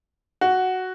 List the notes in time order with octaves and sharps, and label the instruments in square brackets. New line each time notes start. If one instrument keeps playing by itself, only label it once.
[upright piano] F#4